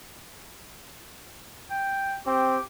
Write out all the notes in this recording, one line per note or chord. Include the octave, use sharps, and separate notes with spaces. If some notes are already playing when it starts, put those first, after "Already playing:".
G5
C4 G4